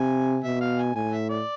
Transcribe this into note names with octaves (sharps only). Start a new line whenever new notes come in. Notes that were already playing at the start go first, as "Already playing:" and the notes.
Already playing: C3 G#5
B2 E5
F5
G#5
A2 G#5
E5
D5